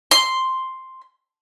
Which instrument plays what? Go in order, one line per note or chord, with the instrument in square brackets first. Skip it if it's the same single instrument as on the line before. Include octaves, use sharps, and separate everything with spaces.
[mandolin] C6